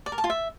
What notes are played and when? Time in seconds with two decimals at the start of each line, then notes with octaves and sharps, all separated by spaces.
0.06 D5
0.12 A#4
0.18 A5
0.24 F4
0.30 E5